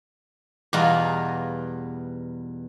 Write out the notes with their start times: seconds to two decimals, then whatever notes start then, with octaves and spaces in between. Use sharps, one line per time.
0.73 E2 B2 G3 F4 G#5 A#5